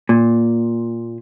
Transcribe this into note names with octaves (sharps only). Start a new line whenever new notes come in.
A#2